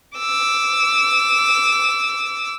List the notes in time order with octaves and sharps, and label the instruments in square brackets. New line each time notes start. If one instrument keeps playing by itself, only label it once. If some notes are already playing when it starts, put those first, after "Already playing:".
[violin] D6 E6